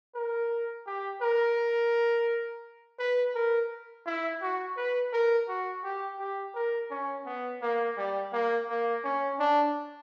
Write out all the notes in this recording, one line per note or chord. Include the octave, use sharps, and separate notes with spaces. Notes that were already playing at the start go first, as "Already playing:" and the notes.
A#4
G4
A#4
B4
A#4
E4
F#4
B4
A#4
F#4
G4
G4
A#4
C#4
B3
A#3
G3
A#3
A#3
C#4
D4